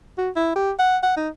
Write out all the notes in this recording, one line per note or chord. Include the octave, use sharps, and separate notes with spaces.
F#4
E4
G4
F#5
F#5
D#4